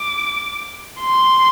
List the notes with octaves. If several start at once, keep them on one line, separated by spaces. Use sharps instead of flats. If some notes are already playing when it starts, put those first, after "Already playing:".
Already playing: D6
C6